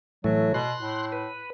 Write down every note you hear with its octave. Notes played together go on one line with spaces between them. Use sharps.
A2 E3 F#3 A3
B2 C6 F#6
A2
B4